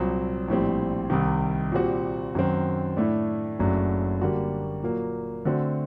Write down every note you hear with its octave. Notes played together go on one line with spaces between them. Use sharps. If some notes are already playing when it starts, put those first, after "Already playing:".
Already playing: C2 A#2 F#3 C4
A#1 A2 G3 C4
C2 C3 D#3
A#2 G3 C4 F#4
F#2 D#3 F#3 C4
A2 A3 D4
F#1 F#2 F#3 A3 D4
D3 G3 A#3 F#4
A#2 F#3 A#3
D3 A3 C4 F#4